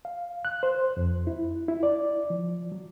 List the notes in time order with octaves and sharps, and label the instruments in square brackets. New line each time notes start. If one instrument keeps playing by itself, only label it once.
[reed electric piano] F5
F#6
C5
F2
E4
E4
D5
F3
F#3